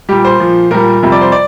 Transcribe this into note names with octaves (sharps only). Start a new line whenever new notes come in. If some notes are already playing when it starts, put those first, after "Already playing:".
A#2 G3 G4
C5
A#2 F3
A#2 G3 A#4
F2 C3 G3
D5
C5
D5